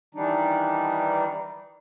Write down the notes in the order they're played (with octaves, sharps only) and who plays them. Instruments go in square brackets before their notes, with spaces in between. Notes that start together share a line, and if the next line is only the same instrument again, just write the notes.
[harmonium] D#3 E3 G3 D4 D#4